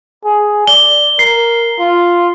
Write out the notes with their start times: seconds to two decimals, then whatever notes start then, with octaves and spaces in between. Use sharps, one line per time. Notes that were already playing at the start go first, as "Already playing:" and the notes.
0.25 G#4
0.67 D5 G7
1.19 A#4 C7
1.79 F4